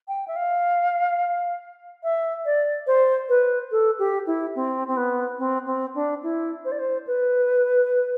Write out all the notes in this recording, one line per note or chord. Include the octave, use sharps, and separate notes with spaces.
G5
E5
F5
E5
D5
C5
B4
A4
G4
E4
C4
C4
B3
C4
C4
D4
E4
C5
D5
C5
B4